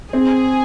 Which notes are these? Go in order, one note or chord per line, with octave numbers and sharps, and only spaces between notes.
C4 G#4